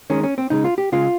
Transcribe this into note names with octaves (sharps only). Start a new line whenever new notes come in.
D#3 G#3 C#4
C#4
C4
C#3 G#3 D#4
F4
G4
C#3 G#3 F4